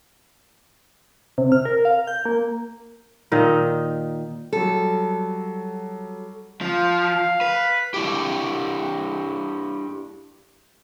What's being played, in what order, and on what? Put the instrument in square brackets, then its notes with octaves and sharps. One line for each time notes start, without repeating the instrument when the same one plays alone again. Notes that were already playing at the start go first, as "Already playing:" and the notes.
[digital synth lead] C3
F6
A#4
F5
G6
A#3
[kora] A#2 D#3 D#4
[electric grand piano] F#3 G3 [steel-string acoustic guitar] A4
[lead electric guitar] F3 [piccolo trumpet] F5
[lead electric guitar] B4
[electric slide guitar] D4 E4 G4